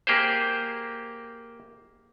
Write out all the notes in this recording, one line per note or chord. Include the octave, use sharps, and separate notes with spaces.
A#3 G4 G#4 C5